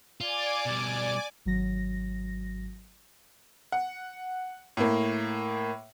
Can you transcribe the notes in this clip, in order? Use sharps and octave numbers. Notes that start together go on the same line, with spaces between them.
F4 D5 G#5 D6
B2 G3
G#1 F#3 A#6
F#5
A2 A#3